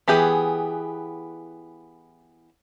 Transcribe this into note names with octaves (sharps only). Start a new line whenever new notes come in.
E3 B3 G4 G#4